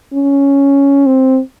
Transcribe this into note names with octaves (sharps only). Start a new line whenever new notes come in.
C#4
C4